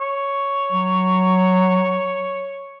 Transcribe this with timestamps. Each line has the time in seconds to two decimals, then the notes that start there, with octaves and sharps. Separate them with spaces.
0.01 C#5
0.72 F#3